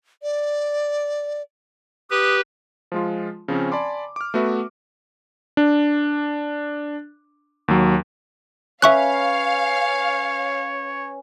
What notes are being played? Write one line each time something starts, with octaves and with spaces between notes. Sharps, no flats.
D5
G4 B4 D#6
F3 G#3 F4
C#3 F3 C4 C#4
D5 G#5 A5 B5 C6 D6
D6 F6
A3 B3 F#4 B4 E5
D4
D#2 F#3
C#4 B4 C#5 E5 F5 C#6 F#6